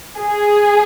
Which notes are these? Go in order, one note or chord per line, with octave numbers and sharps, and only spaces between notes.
G#4